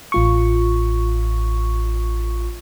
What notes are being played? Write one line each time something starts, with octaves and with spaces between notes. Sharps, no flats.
A1 F4 C#6